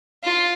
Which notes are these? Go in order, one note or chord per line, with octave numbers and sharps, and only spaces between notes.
F4